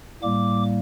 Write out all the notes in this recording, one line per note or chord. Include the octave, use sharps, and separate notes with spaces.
A2 G3 A#3 D6